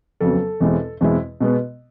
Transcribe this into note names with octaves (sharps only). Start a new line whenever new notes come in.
F2 C#3 F#3 B3 A4
E2 B2 G#3 C4 E4
E2 B2 G#3 C4 E4
B2 G#3 B3